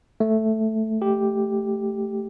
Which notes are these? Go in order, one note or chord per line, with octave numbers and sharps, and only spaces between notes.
A3
G4